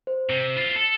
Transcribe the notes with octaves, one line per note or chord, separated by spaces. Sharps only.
C5
C3
E4 F4
A4